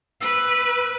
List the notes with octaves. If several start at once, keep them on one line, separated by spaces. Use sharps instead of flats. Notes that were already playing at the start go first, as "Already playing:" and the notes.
B4 E6